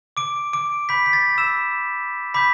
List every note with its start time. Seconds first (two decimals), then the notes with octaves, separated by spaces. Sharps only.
0.17 D6 D7
0.53 D6 D7
0.89 B5 G6 B6
1.06 B6
1.13 A6
1.38 E6 E7
2.34 B5 D6 G6 B6